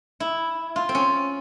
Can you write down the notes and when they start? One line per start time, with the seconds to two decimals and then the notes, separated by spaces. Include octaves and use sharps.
0.20 E4
0.76 F4
0.89 C4
0.95 C#4